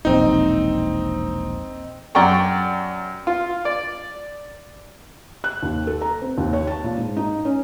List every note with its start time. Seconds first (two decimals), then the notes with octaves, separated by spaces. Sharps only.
0.05 E1 A#1 C4 D#4
2.15 F#2 D5 F#5 G5 A#5 C#6
3.27 F4
3.65 D5
5.44 F#6
5.63 D#2
5.87 A4
6.01 A#5
6.22 C4
6.38 D#2
6.53 C#5
6.67 A5
6.84 A#2
6.97 G#2
7.17 D#4
7.45 C#4